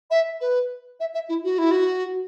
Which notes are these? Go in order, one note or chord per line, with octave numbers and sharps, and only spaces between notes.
E5
B4
E5
E5
E4
F#4
E4
F#4